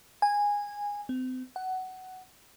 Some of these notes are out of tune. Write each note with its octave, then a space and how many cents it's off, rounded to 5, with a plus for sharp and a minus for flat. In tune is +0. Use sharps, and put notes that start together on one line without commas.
G#5 -15
C4 -35
F#5 +15